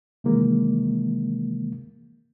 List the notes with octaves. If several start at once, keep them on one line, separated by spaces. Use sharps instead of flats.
C3 D#3 E3 G#3 A#3